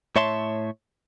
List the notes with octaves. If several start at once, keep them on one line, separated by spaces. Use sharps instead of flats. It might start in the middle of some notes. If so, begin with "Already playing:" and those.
A2 C#5 E5 A5 C6